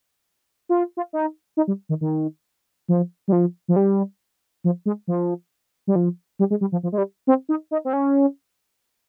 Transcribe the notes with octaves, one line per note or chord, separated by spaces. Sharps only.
F4
F4
D#4
D#4
G3
D#3
D#3
F3
G3
F3
F3
G3
F3
G#3
F3
G3
F3
G3
G#3
G3
F3
F3
G#3
G3
C4
D#4
D#4
C4
C#4